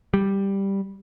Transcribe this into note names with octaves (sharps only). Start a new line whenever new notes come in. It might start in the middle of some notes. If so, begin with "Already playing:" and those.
G3